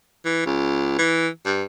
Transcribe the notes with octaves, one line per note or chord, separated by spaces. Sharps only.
E3
C#2
E3
G2